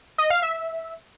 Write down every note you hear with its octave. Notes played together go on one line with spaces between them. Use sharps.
D#5
F5
E5